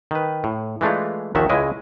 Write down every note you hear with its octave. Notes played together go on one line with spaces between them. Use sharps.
D#3 B4
A2
E3 G#3 A3 D4 F4
A#1 D#2 D#3 F#4 E5
C#2 C#3 G#3 E4 D#5 G#5